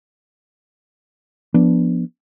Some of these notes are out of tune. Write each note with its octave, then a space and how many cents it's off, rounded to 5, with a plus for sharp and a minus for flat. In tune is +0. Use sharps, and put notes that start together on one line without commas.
F3 +0 B3 -20 D4 -10